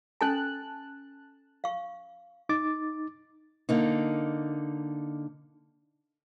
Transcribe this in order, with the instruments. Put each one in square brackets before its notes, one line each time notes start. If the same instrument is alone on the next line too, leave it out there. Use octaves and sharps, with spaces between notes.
[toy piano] C#4 A4 G#5 [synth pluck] A5 F#6
[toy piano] F5 C#6
[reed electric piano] D#4 D6 A6
[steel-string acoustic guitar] D3 A#3 D#4